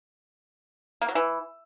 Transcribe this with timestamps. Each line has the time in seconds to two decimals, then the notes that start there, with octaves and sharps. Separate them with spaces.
1.02 A#3
1.08 F#3
1.15 E3